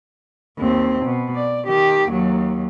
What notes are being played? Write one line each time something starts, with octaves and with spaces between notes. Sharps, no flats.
D#2 C4
B2
D5
D#3 G4
D#2 F#3